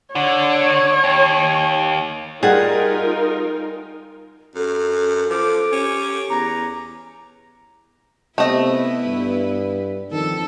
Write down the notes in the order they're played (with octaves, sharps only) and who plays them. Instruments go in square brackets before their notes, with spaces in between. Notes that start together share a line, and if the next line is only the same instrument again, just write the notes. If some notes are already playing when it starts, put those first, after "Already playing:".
[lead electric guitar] D3 [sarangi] C#5
[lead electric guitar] D#2
[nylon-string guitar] G3 F#5 [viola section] D#4 F4 A#4 [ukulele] G#4
[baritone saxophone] F#2 [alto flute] A4
[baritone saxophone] F3 [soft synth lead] D6
[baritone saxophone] C#4 [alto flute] G4
[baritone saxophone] E2 [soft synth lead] A#5
[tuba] C3 [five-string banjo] A3 D#5 [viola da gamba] B3 E4 B4
[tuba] G2
[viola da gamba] F2 A4 [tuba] D#3